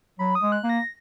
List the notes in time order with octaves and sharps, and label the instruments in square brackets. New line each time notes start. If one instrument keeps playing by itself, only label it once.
[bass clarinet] F#3 [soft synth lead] B5
[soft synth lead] D#6
[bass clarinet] G#3
[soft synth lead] F#6
[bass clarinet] A#3
[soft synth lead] A#6